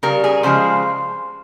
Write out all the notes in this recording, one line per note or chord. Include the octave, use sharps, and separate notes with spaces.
C#3 G3 A#4
G#4
C#3 F3 G#3 C5